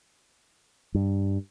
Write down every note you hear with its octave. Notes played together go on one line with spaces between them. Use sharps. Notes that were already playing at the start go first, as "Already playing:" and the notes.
G2